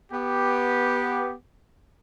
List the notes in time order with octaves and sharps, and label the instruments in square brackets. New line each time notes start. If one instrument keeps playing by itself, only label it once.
[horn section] B3 G4